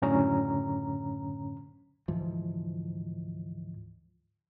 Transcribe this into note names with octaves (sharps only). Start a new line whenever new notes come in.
C#2 F#2 A2 D3 C#4 A#5
D2 G#2 E3 F3